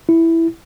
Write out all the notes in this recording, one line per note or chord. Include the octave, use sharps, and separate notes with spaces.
E4